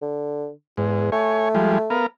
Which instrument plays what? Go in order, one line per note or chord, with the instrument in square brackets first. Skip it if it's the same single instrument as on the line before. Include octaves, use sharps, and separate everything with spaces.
[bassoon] D3
[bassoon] E2 [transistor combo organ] G#2
[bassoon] A3 [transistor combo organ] C#5 G#5
[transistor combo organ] F3 G3 G#3
B3 A#4 F5